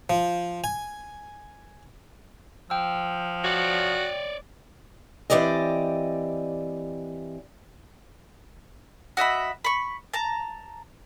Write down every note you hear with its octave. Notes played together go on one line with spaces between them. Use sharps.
F3
G#5
F3 G5 E6
F#4 C#5 D5
E3 C4 G4 D5 D#5
F#4 D#5 E5 B5
B5 C#6
A5 A#5